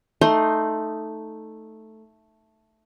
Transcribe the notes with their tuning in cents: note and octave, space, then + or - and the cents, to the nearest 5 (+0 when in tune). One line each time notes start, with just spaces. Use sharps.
A3 +0 D#4 +0 C6 +10